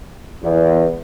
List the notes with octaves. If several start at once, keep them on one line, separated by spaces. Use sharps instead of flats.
E2